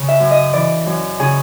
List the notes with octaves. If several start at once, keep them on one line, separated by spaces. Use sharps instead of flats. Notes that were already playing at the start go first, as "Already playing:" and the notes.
Already playing: C#3
E5
F#2
D#5
E3 D5
F#2
C#3 G#4